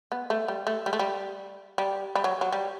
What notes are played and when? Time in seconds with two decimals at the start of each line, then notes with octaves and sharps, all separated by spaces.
0.12 B3
0.30 A3
0.48 G3
0.67 A3
0.86 G3
0.93 A3
0.99 G3
1.78 G3
2.15 G3
2.24 F#3
2.41 F#3
2.52 G3